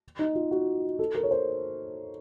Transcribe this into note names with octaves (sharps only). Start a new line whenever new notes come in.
D#4
F4
F#4
A4
A#4
C#5
C5